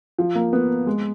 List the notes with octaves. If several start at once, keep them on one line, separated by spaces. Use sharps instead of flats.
F3
A#3
B3
G#3